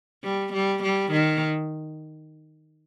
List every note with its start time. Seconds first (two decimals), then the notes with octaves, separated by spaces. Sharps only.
0.24 G3
0.53 G3
0.83 G3
1.12 D#3